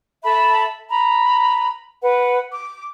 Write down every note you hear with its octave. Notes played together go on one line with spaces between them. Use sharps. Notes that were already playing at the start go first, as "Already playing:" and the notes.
A4 E5 A5 B5
A#5 B5
B4 F#5
D6